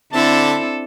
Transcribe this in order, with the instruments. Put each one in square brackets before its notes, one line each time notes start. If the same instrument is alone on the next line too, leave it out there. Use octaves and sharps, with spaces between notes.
[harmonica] D3 E5 A5 [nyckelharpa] C4 E4 [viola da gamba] D4 A4